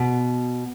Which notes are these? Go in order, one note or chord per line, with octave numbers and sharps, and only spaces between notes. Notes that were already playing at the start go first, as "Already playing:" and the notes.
Already playing: B2